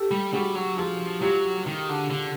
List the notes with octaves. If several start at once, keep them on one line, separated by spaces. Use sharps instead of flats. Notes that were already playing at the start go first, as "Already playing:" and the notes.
Already playing: G4 A4
G3
G3 F#4 G#4
F#3
F3 F#4 G#4
F#3 F4 G4
D#3
D3
D3